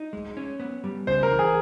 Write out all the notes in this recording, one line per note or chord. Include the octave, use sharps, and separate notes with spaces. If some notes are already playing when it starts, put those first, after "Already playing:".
Already playing: D#4
G#3
C#4
B3
G3
C#3 C5
A#4
E3
G#4